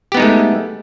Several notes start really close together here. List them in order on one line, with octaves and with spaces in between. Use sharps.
G4 B3 D#4 G#3 A3